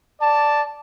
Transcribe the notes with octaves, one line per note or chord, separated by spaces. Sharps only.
D5 A5